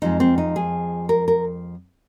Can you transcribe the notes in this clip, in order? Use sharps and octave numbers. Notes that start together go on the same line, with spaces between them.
F2 F3 G#3 D#4
C4
D#4
G#4
A#4
A#4